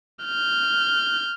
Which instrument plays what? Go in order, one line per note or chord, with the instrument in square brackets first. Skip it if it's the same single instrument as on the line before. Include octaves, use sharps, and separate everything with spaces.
[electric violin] F6 G6